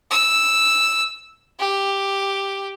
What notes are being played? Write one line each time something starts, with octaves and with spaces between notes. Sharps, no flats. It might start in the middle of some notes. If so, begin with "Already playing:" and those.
E6
G4